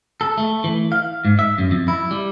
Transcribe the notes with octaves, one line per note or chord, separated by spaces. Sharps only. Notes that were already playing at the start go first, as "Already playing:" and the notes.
A4
A3
E3
F5
G#2
E5
F#2
F2
E4
G3